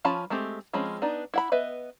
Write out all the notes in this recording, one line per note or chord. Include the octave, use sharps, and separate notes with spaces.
F3 C#4 F4 A5 B5
G#3 A3 C4 G4
F3 G#3 C4 C#4 B5
B3 D4 D#4
E4 F#5 B5
B3 B4 D#5 E5